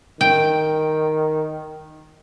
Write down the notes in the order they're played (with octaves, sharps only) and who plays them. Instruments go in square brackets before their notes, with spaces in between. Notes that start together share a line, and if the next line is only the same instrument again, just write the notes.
[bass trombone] D#3 [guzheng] G5